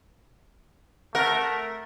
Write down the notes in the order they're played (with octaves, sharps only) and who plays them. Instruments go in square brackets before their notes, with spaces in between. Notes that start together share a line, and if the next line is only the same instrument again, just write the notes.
[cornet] A3 [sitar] A#4 [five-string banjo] F#5